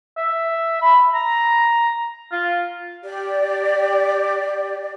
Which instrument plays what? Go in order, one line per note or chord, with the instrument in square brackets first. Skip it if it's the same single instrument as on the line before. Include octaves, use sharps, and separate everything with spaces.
[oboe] E5
B5
A#5
F4
[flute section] G4 D5